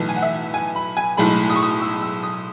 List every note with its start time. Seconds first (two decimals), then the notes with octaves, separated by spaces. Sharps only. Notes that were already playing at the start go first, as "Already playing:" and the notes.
Already playing: B1 A2 E3
0.09 G#5
0.16 F#5
0.22 E5
0.54 G#5
0.75 B5
0.97 G#5
1.17 B1 A2 G#3 B5
1.50 D#6
1.56 C#6
1.63 D#6
1.81 E6
2.01 E6
2.23 D#6